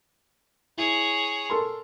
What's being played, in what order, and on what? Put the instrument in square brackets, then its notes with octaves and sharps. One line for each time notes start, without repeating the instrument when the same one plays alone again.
[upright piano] E4 [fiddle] G#4 C#5
[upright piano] A4 A#4 C6